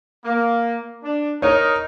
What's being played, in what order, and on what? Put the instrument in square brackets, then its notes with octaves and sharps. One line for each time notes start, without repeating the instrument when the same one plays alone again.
[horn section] A#3
D4
[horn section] D#4 A#4 [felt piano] C#5